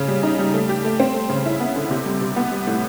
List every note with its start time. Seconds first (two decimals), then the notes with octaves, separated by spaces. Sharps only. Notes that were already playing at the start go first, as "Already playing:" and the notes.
Already playing: C#3
0.08 G3
0.23 D#4
0.39 G3
0.54 A3
0.69 G4
0.85 A3
1.00 C4
1.14 A3
1.29 C#3
1.45 E4
1.60 B3
1.76 D3
1.91 C3
2.06 G3
2.21 C3
2.36 B3
2.51 G3
2.67 A2